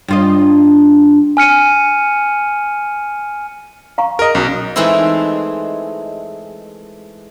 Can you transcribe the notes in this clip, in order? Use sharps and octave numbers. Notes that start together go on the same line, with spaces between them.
G2 F4 D#5
G#5 F6 C#7 D#7
F5 A#5 C#6
G#4 A#4 D#5
B1 C#4 F#4
E3 G#3 A3 C4 D#4 E4